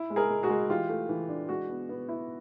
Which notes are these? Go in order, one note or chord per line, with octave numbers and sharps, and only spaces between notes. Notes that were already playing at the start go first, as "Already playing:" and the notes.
Already playing: E4
G#3
G#4 A#4
G#3
F#4 G#4
G#3
E3 F4 G4
A3
E3
D4
G#3 F#4
B3
B3
E4